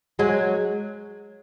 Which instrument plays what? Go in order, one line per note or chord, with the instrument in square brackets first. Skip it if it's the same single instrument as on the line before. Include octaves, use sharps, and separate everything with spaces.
[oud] F#3 G#3